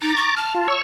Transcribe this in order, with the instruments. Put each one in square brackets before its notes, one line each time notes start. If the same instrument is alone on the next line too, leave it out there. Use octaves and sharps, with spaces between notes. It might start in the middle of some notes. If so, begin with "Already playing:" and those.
[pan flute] D#4 [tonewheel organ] A#5 D6 A6
[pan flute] C#6
[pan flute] A5 [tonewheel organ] F6
[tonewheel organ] F4
C#5 C#6 E6